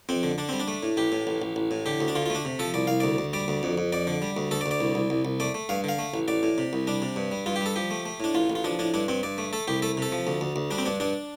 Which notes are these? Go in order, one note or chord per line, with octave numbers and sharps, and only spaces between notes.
F2 C4
D3
D3 D4
G3 C4
D4
A3
A2
A1 G4
A2
A1
A1
A1
A2
D3 G4
D2
D4
D3 F4
F4
A3 D4
C3
F3 A4
C2 D5
C2 F5
D2 D5
D2
G3 D5
D2
F2
F2
F2 D5
D3
G3
D2
D2 A4
D5
D2
D5
C2
C2
C2
C2
A3 D5
A3
G2 F5
D3 F5
A3
A1
A1 D5
A2
C3
C2
G3 D4
C3
G2
G3
G2 F4
G4
G3 A4
F3 G4
A3
A3
A2 D4
A1 F4
A1
F4
F3 D4
A2 D4
G2 D4
G2 C4
G2 D5
A3
A3 A4
C2 G4
A3 A4
C3 A4
F3
D2
D2
D2
G3 D4
C4
G2 D4
G2 D4